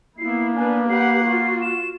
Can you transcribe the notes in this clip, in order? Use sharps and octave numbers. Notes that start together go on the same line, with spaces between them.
A#3 B3 E4 C7
B3 D4 B4 G#5
G4 B4 F#5 C7
F4 F#4
E7